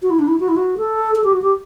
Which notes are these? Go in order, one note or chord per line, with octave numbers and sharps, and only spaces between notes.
F#4
E4
D4
E4
F#4
E4
F#4
A4
A4
G4
F#4
G4